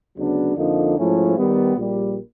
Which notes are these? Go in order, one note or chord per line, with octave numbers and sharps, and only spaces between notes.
D2 C#3 F#3 B3 D4
F2 D3 F3 A#3 D#4
G#2 F3 A3 C#4 E4
D#3 G3 B3
A#1 A#2 G3